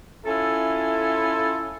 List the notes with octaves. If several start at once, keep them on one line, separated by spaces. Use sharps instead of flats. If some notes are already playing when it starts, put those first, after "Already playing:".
C#4 E4 F4 A4